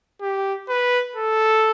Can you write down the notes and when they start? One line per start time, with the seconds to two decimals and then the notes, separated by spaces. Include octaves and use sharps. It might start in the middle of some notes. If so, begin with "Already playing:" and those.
0.21 G4
0.69 B4
1.16 A4